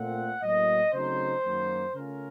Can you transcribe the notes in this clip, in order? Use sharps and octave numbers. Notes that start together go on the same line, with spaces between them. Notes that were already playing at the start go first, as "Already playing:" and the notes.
Already playing: A#2 A3 C4 F#5
A2 F#3 A#3 D#5
C#3 F#3 A3 C4 D#4 C5
F#2 D#3 F#3 A#3
C#3 A3 C#4 F4 A#4